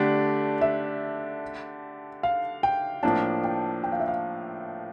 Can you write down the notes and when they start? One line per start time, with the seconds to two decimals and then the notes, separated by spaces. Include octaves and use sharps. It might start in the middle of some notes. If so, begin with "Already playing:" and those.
Already playing: D3 A3 D4 G4 D5
0.61 E5
2.23 F5
2.63 G5
3.03 A2 F3 A#3 D4 A5
3.44 G5
3.83 G5
3.92 F5
4.00 E5
4.08 F5